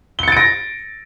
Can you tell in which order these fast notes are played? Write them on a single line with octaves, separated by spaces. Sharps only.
G7 C#7 A6 D7 A#6